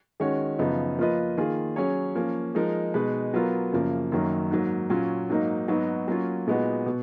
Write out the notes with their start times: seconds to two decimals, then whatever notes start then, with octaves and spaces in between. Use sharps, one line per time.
0.20 D#3 G#3 C#4 F#4 C#5
0.59 F#2 C#3 F3 B3 D#4
0.99 F3 A#3 F4 B4 D#5
1.37 D#3 A#3 F4 G#4
1.76 F#3 C#4 G#4 C#5
2.15 F3 A#3 C#4
2.55 F3 G#3 D#4 A#4
2.94 B2 G#3 D#4 G#4 B4
3.34 F#3 B3 F4 A#4
3.72 F#2 C#3 F3 A#3
4.12 F#2 D#3 F#3 A#3
4.51 G#2 F#3 A#3
4.90 A#2 F#3 C#4 F4
5.30 G#2 F#3 A#3 D#4
5.68 G#2 F#3 B3 D#4 F#4
6.08 F#3 A#3 C#4 F4
6.47 A#2 G#3 B3 D#4 F#4
6.86 B2